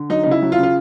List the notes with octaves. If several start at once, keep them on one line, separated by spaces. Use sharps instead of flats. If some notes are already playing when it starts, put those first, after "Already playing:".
Already playing: D3
F#3 D#4
D#4
C#3
E4
F#3
F4
C#3
F4